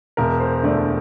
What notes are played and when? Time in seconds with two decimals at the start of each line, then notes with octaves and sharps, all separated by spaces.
0.17 E1 A#4
0.40 C5
0.63 D2 D3 A3 D5